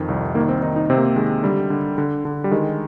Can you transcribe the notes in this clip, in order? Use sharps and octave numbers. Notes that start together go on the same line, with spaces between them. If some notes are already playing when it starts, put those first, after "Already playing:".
Already playing: F2 D#3
C2
D#3 A#3
C4
D#3 D#4
D#4
C3 C4
A#3
C4
D#3 G#3
D3 G3
D3
D3
D3
G3
D#3 G#3